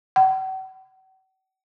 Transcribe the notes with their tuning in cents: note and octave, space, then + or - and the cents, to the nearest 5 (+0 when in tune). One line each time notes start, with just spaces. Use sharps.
F#5 +45